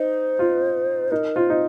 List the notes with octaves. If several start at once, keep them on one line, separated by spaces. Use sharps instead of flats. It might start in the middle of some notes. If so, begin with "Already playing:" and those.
Already playing: D#4 C5
F4
D#4 A#4
F4 C5
D#4